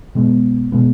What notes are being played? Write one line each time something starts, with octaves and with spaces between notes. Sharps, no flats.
B2 G#3 B3
B2 G#3 B3